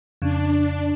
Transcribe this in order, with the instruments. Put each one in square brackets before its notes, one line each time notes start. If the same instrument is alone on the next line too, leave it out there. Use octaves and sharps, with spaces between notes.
[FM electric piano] F2 C#3 [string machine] D4